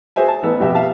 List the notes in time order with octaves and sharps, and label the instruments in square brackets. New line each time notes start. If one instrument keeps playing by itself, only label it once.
[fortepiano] F#4 G#4 C5 E5 G#5
A5
A1 B3 E6
F2 B2 G4 E5
E5 F5 A5